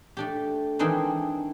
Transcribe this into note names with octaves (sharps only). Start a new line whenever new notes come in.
A3 D4 G4
D#3 E3 G#3 C4 D4 D#4